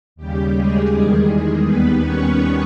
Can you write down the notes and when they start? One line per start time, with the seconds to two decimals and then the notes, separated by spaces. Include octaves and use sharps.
0.16 D#2 C#3 G3 G4
0.53 G#3 G#4
0.91 E2 D#3 G3
1.65 D#2 D#3 G3 B3 B4
2.03 C#4 C#5